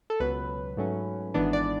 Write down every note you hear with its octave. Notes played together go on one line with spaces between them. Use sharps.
A4
C#2 B2 F#3 B3 B4
G#2 F#3 A3 C#4
G#1 G#2 E3 B3 D4
D5